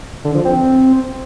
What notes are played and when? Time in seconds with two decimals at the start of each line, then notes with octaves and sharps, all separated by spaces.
0.25 D3
0.35 F3
0.45 C4